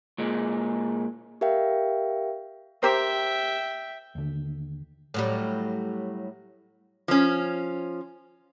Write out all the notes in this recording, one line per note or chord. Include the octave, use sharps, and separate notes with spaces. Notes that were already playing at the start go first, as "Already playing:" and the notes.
A#2 G#3
G4 A#4 E5 F5 G5
G4 A#4 C5 E5 G5
D#2 D3
A2 F#3 G3
F3 C#4